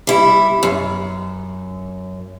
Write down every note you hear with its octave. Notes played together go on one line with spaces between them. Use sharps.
G3 E4
F#2